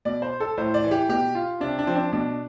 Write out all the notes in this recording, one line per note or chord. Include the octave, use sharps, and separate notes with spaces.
B2 D5
C5
A4
A2 C5
D5
E3
G4
B2 G4
F4
C3 D4
D4
F3 C4
D4
B2 D4